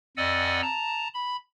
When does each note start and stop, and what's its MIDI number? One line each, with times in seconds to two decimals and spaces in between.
0.17 0.61 41
0.17 0.61 74
0.17 0.61 75
0.17 0.61 78
0.17 0.61 80
0.17 0.61 88
0.62 1.08 81
0.62 1.08 82
1.14 1.36 83